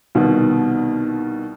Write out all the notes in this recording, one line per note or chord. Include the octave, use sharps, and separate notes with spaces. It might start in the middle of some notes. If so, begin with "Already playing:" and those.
C2 B2 D#3